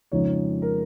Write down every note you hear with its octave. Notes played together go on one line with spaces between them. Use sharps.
F2 C#3 F3 G#3 D#4 C#5
A#4